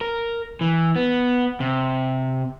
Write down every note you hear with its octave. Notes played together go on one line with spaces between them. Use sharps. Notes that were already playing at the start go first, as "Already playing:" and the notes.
A#4
E3
B3
C3